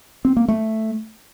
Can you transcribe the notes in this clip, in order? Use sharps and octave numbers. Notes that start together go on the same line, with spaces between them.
C4
A#3
A3